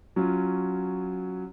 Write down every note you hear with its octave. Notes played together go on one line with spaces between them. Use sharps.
F#3 C#4 F4